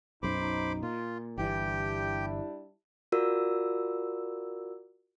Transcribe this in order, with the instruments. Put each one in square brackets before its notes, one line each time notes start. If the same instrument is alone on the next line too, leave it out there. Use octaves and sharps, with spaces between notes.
[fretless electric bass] B1 F#2 [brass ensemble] D#4 [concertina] C5 B5 D6
[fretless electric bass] A#2 [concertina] F4
[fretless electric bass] G1 E3 [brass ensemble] G3 D4 E4 [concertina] G4 G5
[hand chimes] F4 F#4 A#4 D5 E6